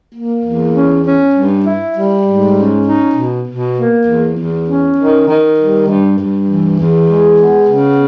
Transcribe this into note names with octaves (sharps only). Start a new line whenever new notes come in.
A#3
E2
C#4
C#4
G2
E4
G3
G#2
C#4
D#4
B2
B2
A#3
E2
E2
C#4
D#3
D#3
G3
G2
G2
E3
E2
G#3
B3
C#3